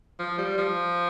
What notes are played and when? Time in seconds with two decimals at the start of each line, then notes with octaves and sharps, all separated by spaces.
0.19 F3
0.38 G3
0.58 F3